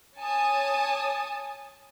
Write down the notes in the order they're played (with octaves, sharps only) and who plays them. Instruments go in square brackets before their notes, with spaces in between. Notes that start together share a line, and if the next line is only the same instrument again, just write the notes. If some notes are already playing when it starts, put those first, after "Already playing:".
[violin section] C#5 G#5 A5 D#6